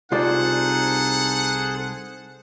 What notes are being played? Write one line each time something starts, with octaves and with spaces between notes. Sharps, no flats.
C2 D#4 F4 G#4 A4 C5 D5 F#5